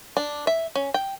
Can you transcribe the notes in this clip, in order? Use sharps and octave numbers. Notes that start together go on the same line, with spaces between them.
D4
E5
C#4
G5